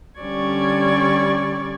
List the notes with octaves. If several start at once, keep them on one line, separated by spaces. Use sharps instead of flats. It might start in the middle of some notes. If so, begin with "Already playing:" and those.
D3 G3 C#4 D5 C#6 G#6